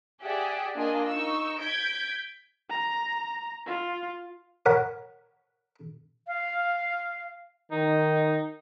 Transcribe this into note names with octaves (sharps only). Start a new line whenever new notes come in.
G4 G#4 D5 E5 F#5 G#5
A#3 D4 F4 D#5 G#5
D#4 C#6 E6
G6 G#6 B6 D7
A#5
F4
A#4 C#5 F#5 B5
F5
D#3 D#4